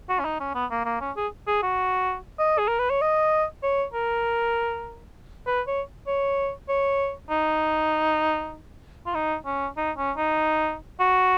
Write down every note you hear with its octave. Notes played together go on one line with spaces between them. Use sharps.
F#4
C#4
D#4
C#4
B3
A#3
A#3
C#4
G#4
G#4
F#4
D#5
G#4
A#4
B4
C#5
D#5
C#5
A#4
B4
C#5
C#5
C#5
D#4
F4
D#4
C#4
D#4
C#4
D#4
F#4